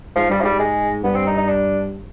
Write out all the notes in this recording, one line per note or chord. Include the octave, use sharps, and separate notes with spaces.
G#2 F3
G2 G3
G#2 F3 G3
G#3
G2 B3
C4
D#4
D#4
D4